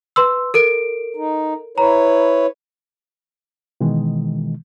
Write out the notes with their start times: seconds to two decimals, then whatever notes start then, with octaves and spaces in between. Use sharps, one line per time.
0.16 B4 C6 E6
0.54 A4 A#4 D7
1.17 D#4
1.78 E4 B4 C#5 A#5
3.81 B2 D#3 E3 G#3